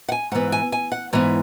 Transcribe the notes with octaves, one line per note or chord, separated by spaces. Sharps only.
F#5
G#5
G#2 E3 B3 F#5
G#5
G#5
F#5
G#2 E3 B3 C#5